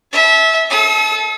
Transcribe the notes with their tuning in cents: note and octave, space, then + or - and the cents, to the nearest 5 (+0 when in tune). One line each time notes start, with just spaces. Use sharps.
E5 -20 A5 -35
A4 -30 D#6 +45